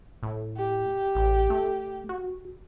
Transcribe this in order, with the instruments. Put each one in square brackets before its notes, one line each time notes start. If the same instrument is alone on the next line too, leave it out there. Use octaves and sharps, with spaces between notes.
[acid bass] A2
[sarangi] G4
[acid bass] A1
A3
F#4